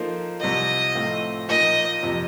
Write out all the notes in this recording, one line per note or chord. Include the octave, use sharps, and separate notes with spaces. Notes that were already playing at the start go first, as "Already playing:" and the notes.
Already playing: F3 A#3 D#4 A4 C5
C2 C3 F3 D#5
A2 F3 A3 C4 F4
A#2 F3 A#3 D#4 D#5
F2 C3 F3